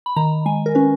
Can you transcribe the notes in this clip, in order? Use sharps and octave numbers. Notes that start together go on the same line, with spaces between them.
B5
D#3 A#5
G#3 G#5
A#4
C#4 B4